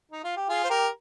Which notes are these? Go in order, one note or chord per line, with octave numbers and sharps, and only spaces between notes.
D#4
F4
G4
F4 G#4
C5
G4 A#4